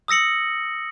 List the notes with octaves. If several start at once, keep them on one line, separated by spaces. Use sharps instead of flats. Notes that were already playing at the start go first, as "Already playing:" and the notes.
D#6 E6 A#6 C#7 F#7